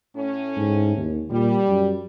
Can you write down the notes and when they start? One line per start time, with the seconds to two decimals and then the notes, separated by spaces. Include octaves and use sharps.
0.16 A2 C#4
0.56 G#2
0.97 D#2
1.31 A#2 G3
1.68 F#2